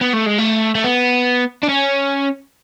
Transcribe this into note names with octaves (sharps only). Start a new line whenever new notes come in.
B3
A3
G#3
A3
A3
B3
D4
C#4